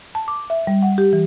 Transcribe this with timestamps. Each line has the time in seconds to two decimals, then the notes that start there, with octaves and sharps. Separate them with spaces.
0.15 A5
0.28 D6
0.50 E5
0.67 G3
0.82 F#5
0.98 G4
1.13 E3